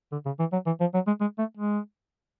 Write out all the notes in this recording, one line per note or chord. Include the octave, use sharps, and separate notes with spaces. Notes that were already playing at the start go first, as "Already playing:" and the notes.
D3
C#3
E3
F#3
E3
F3
F#3
G#3
G#3
A3
G#3